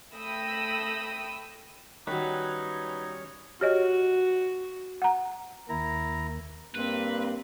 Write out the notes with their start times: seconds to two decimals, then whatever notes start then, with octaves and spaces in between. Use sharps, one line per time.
0.14 A3 G5 B5 D#6 E6 A#6
2.07 D#3 F#3 G3 C#4 D#4 B4 C#5
3.61 F#4 G4 C#5 D#5
5.02 F#5 A#5
5.69 D#2 D#3 E4 A#5
6.75 G2 A#3 C4 B4